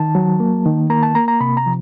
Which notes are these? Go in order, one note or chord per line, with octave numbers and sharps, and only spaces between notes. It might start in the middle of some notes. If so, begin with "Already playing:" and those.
Already playing: D#3 A5
F#3
A#3
D#3
A#3 A#5
A5
A#3 A#5
A#5
C3 B5
A#5
F3